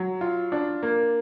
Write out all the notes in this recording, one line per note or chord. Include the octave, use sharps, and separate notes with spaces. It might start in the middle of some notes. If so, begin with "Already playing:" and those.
Already playing: F#3
F4
D4
A#3